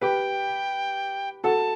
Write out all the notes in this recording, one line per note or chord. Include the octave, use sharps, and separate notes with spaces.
G4 B4 G5
F#4 A4 A5